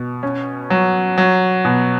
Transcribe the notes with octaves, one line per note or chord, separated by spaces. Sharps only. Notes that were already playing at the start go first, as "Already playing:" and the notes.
Already playing: B2
C#4
F#3
F#3
B2